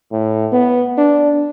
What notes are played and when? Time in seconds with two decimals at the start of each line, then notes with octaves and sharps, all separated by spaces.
0.12 A2
0.52 B3
0.98 D4